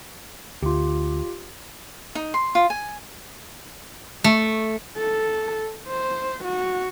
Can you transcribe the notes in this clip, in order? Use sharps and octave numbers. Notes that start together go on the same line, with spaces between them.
D2 F4 G4
D#4
C6
F4
G#5
A3
A4
C5
F#4